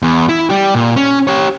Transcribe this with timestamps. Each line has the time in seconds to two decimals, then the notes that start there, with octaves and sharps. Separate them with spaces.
0.02 E2
0.29 E4
0.50 G3 G4
0.75 A#2
0.96 C#4
1.28 G4 C#5